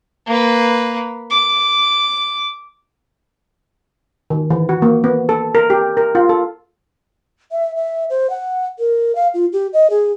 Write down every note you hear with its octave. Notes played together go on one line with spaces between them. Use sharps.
A#3 B4
D6
D#3
E3
F#4
A#3
B3
A4
A#4
G4
A#4
F4
A4
E5
E5
C5
F#5
A#4
F5
F4
G4
D#5
G#4